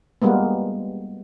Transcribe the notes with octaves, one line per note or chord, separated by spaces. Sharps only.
G3 G#3 A#3 B3